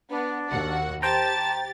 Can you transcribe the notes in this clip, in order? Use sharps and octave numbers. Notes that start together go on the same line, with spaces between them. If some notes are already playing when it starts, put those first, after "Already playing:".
B3 D4
D#2 F#4 F#5
G4 C5 G5 A5 A#5 A6